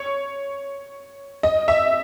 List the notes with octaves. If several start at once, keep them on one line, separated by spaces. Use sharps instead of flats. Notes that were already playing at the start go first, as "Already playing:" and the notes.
Already playing: C#5
D#5
E5